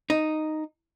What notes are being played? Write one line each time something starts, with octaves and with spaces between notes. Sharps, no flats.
D#4